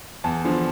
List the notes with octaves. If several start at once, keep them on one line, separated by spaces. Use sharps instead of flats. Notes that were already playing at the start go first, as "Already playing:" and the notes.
E2 A5
D3 F3